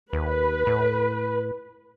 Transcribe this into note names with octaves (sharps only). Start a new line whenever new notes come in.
D#2 B4
A2